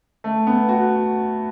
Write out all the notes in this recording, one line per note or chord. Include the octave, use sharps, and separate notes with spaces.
A3
B3
F#4